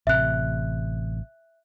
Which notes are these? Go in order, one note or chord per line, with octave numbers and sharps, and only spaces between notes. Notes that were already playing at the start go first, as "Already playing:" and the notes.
A1 C3 E5 F#6